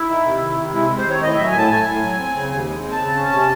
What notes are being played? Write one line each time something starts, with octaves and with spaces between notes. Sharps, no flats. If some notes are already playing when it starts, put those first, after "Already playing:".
Already playing: E4
D#3
C3
D#3
C3
G#3 E4
C3
C5
D#3 C#5
A2 D#5
F#3 E5
G#5
A2 A5
A3 G#5
A2
F#3
C4
C#3
D#2
G#3
C4
A5
C#3
C#4
C3